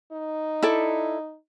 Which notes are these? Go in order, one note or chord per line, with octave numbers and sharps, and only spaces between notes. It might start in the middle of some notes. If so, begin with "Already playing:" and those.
D#4
E4 A4 D5